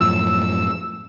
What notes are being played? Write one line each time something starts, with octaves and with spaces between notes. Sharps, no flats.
F#2 A2 F3 E6